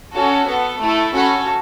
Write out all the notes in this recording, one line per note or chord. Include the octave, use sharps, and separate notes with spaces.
C#4 F#4 A4
B3 A4
A3 E4 A4
C#4 F#4 A4 F#5 B5